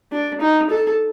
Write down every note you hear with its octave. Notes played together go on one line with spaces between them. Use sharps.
D4
D#4
A4